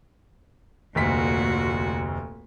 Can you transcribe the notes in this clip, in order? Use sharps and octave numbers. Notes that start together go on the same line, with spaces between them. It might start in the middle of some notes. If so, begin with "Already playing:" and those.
F1 D2 A#2 F#4 B6